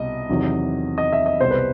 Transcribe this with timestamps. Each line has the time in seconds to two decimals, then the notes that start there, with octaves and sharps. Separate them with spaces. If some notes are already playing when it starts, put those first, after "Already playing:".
Already playing: C2 B2 D#5
0.29 E2 C3 D#3 F#3
0.98 D#5
1.12 E5
1.26 D#5
1.40 C2 B2 G3 C5
1.51 B4